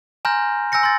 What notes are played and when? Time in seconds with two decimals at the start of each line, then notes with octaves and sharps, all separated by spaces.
0.25 G#5 A#5 C6 F6 G6 A#6
0.72 G#5 E6 G6 A#6 C#7
0.83 C6 A6